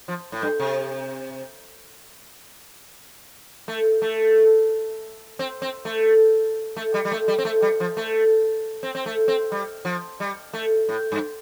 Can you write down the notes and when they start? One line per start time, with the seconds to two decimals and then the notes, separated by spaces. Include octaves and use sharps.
0.08 F3
0.32 A2
0.42 G2
0.60 C3
3.68 A3
4.02 A3
5.39 C4
5.62 C4
5.85 A3
6.77 A3
6.94 G3
7.05 G3
7.12 A3
7.28 G3
7.38 C4
7.45 A3
7.62 G3
7.80 F3
7.97 A3
8.83 C4
8.95 C4
9.06 A3
9.28 C4
9.52 G3
9.85 F3
10.20 G3
10.54 A3
10.89 A2
11.12 G2